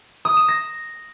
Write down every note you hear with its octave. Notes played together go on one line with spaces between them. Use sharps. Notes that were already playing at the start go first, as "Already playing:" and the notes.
D#6
E7
A#6